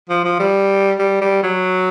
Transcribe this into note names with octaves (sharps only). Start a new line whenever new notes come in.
F3
F3
G3
G3
G3
F#3